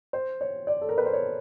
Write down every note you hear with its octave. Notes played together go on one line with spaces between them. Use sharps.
C5
C#5
D5
A4
A#4
B4
C5
C#5